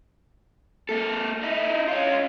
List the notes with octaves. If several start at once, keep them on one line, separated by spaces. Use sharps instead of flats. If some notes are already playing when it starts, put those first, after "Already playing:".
A#3 A4
D#4 E4
C#4 F4